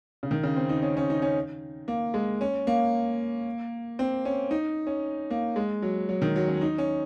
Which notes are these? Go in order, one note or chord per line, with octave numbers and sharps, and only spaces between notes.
C#3
D#3
C#3
C4
D#4
C#4
C#4
D#4
C#4
A#3
G#3
C#4
A#3
C4
C#4
D#4
C#4
A#3
G#3
F#3
F#3
D#3
F#3
C#4
D#4
C#4